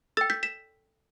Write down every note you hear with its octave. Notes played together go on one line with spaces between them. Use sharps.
A4 G5 E6 A6
G6 B6
B6 E7